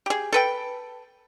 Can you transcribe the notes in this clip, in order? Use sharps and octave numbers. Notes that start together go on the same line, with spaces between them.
G4 G#4
A4 B4 G5